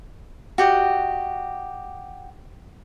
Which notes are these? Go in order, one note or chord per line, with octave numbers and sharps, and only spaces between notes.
F#4 G4 D#5